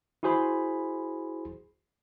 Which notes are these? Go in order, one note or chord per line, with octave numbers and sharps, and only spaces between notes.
E4 F#4 G#4 C5 B5 C6